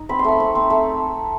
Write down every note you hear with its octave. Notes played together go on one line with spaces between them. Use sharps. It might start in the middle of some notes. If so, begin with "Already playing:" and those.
Already playing: D#4
C4 B5
C6
A3 B5
C4
C4
A3